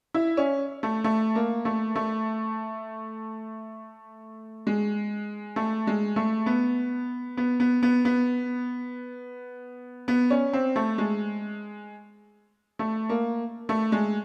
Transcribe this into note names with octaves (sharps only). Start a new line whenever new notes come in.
E4
C#4
A3
A3
A#3
A3
A3
G#3
A3
G#3
A3
B3
B3
B3
B3
B3
B3
C#4
C4
A3
G#3
A3
A#3
A3
G#3